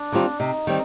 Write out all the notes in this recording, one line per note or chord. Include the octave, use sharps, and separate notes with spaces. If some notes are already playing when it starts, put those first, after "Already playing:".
Already playing: D4
D#3 G3 C4 F4
C3 D#4
D#3 G3 C4